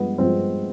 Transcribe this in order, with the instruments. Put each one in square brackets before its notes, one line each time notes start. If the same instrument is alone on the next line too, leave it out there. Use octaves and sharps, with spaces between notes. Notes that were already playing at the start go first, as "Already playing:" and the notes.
Already playing: [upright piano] G2 F3 G#3 B3
G2 F3 G#3 C4